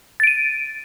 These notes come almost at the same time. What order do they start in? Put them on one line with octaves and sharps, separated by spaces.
A6 D7 D#7